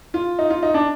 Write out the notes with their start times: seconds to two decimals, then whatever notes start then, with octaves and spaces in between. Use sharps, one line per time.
0.14 F4
0.39 D#4
0.50 F4
0.63 D#4
0.74 D4